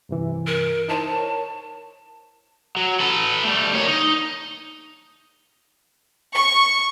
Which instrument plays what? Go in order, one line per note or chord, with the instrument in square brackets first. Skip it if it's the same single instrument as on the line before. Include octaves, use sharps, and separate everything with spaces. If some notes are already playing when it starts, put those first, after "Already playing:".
[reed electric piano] G2 C3 E3
[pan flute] A#4
[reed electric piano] D#4 E4 C5 [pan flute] A5
[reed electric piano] A#4 C#5
[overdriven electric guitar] F#3
A4 B4
G3 A3
A#3 C#5
D#4
[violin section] C#6